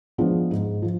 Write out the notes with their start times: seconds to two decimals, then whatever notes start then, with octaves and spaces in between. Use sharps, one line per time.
0.18 F3 G#3 B3 D4
0.51 G#2
0.82 F3